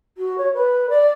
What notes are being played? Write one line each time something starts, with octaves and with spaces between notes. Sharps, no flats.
F#4
C#5
B4
D5